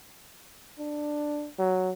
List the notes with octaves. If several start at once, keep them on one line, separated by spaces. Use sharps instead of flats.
D4
F#3